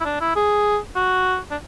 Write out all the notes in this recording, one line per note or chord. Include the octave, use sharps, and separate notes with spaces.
E4
D4
E4
G#4
F#4
D4